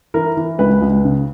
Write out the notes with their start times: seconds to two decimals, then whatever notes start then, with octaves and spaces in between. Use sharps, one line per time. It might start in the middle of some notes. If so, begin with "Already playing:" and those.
0.14 E3 A#4
0.37 E3
0.59 C#2 B4
0.82 C#2
1.05 C#3